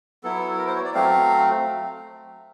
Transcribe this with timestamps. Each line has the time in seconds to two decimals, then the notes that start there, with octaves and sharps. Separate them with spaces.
0.24 F#3 B3 E4 A4
0.58 A#4
0.67 C5
0.76 C#5
0.84 D5
0.94 F#3 A3 C4 F5